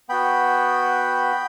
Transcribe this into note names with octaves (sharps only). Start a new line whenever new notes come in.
B3 F#4 G5 B5